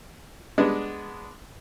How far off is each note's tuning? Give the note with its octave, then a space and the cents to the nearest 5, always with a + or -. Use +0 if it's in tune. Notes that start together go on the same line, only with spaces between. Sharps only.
G#3 +0 B3 +0 D4 +0